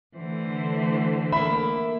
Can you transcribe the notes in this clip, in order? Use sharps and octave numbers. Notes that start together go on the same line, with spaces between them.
D3 E3 A3 C5
A#3 E5 B5